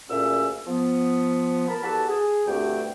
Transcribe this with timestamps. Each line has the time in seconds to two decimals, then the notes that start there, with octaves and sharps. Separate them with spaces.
0.09 D2 A#2 C#4 G#4 E5 E6
0.67 F3 B3
1.68 A#4 A5 B5
1.82 E2 F#4 G4 A4 A5
2.08 G#4
2.47 D2 G2 A3 C4 G4 G5